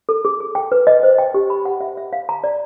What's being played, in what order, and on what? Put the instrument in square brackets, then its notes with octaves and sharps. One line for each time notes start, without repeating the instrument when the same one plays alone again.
[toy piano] A4
G#4
G#4
G5
B4
D#5
C5
G5
G4
B5
F#5
E5
E5
F5
A#5
D5